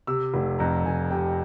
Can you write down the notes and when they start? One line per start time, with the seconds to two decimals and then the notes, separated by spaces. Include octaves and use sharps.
0.07 C3 E6
0.34 F1
0.59 F2 A#5
0.85 F1 G#5
1.11 C3 G5